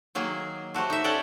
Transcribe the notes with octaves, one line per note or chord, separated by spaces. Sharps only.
D#3 F#3 A#3 G#4
A3 F#4 G4 C5
D#4 E5
C#4 G4 A4 D5 F#5 G5